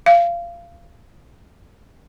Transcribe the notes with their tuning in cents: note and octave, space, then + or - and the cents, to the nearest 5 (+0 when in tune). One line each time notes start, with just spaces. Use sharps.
F5 -25